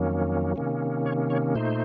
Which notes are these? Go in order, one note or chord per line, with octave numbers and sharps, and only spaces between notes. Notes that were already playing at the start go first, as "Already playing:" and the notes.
Already playing: F2 D#3 F#3 A#3 C#4
C3 D#3 A#3 C#4
C#5
C#5
A#2 A3 D#4 C5